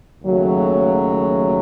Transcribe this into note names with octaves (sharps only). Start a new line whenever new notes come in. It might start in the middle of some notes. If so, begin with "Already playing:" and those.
D#2 C#3 F#3 A3